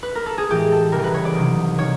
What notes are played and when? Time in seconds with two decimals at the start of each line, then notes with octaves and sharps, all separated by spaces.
0.03 B4
0.15 A#4
0.26 A4
0.38 G#4
0.50 A2 E3 G#3 G4
0.72 A4
0.92 C#2 C#3 E3 G3 A#4
1.04 B4
1.14 C#5
1.25 D5
1.35 C2 C3 D#3 F#3
1.78 C3 D#3 C#5